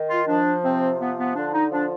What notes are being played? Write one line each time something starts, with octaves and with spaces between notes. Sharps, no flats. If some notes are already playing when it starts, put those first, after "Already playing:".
Already playing: D#3
F4
F3 D4
C3 C4
F3 B3
B3
D3 D4
D#4
F3 D4